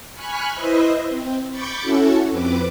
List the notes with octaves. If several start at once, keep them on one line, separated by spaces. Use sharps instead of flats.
G#5 B5 C#6 F6 F#6
E4 B4 C5 D#5 E5
C4
B5 C#6 D6 G6 A6 C#7
C#4 E4 F#4 A4
F2 C4 B4 D6